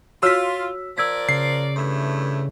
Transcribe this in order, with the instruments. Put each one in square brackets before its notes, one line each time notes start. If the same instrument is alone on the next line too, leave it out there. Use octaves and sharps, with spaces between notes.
[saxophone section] F4 [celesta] F#4 C#5 F6 [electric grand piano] E6 B6
[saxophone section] F3 A#4 D5 [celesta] E6 G#6 B6
[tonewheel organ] C#3 [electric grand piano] C7
[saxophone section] G2 E3 A3